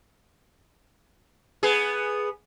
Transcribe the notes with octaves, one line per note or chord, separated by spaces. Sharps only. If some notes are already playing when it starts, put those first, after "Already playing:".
B3 G#4